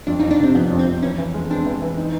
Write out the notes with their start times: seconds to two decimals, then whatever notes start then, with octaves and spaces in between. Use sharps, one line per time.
0.07 F2 D4
0.20 D#4
0.23 F2
0.31 D4
0.40 C3 C4
0.55 F3 B3
0.70 F2
0.79 C4
0.86 F2
1.02 E3 C#4
1.18 E3
1.34 G#3
1.50 C4 D4
1.66 E3
1.82 E3
1.97 D#4